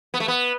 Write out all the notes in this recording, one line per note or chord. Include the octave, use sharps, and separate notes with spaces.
B3
A3
B3